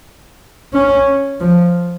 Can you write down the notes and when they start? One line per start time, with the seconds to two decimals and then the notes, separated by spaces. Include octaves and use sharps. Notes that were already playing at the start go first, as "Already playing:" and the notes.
0.73 C#4
1.41 F3